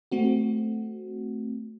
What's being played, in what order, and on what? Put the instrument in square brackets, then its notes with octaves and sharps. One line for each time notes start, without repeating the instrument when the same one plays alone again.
[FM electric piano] A3 C4 F#4